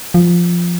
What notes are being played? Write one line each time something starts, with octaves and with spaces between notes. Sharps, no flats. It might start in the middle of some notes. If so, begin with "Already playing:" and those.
F3